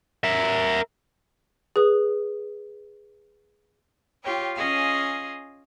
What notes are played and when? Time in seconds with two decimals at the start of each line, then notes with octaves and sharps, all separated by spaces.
0.24 A#4 E5
1.76 G#4 B4 D#6
4.23 F4 G4 C#5 G5
4.55 C#4 F4 G#4 D#5 F5 G#5